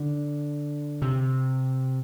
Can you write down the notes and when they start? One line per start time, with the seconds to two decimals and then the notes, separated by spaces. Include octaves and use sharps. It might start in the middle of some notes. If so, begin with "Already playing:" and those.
Already playing: D3
1.02 C3